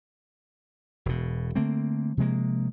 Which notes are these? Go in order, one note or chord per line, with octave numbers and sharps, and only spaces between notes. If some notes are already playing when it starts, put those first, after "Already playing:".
E1 B2
D3 A3 A#3 C4
C3 F3 G#3 A#3